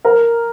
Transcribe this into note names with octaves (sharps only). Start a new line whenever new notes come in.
A#4